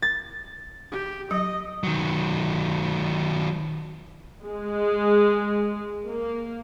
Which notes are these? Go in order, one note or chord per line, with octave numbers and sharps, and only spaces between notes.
A6
G4
F#3 D#5
D#3 F#3
G#3
A#3